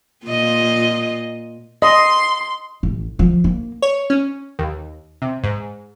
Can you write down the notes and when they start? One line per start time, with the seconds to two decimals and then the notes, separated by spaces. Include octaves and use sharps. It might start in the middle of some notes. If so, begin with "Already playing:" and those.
0.25 A#2 F4 D#5
1.82 D#5 C6
2.83 A1
3.19 F3
3.44 A#3
3.82 C#5
4.10 C#4
4.59 D#2
5.22 C3
5.44 G#2